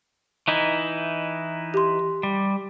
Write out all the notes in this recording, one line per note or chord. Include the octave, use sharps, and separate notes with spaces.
E3 D#4 E4
G4 C6
G3